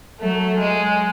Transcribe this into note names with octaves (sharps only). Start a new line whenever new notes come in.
F#3 A3
G#3